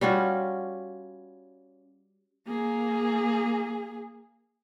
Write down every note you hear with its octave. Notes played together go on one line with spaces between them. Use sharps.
G3 C#4 F4 F#4
A#3 G#4